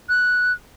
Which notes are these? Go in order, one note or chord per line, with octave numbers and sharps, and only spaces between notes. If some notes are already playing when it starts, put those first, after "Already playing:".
F#6